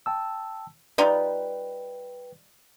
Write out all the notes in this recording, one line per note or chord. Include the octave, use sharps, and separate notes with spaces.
G5 A5 E6
G3 D#4 F4 B4 G5